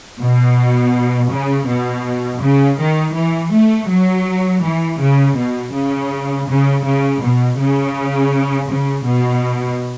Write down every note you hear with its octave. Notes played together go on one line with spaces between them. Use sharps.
B2
C#3
B2
C#3
D#3
E3
A3
F#3
E3
C#3
B2
C#3
C#3
C#3
B2
C#3
C#3
B2